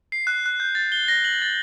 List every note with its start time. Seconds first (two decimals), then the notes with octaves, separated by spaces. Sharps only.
0.12 C7
0.27 F#6
0.46 F#6
0.60 G6
0.75 A6
0.92 G7
1.08 A#6
1.24 F#7
1.42 A6